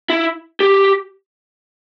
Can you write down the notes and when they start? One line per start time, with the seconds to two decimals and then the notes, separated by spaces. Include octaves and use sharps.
0.10 E4
0.60 G4